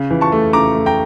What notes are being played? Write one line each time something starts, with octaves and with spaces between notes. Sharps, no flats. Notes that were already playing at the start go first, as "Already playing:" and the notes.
Already playing: C#3
E3
A5 C#6
A3
C#3 A#5 D6
A3
G5 A#5